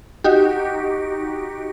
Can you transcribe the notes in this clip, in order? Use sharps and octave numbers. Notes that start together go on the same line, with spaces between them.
D#4 F#4 G4